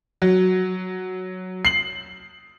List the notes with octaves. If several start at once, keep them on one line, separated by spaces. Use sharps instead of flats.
F#3
C7 F#7